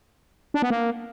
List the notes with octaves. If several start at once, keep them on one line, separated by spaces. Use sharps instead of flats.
D4
B3
A#3